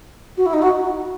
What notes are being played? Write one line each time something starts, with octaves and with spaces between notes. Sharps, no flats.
F#4
E4
D#4
F#4